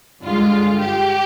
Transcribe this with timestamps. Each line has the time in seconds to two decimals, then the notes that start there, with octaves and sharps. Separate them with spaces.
0.22 G2 D3 G#3 F4
0.79 G4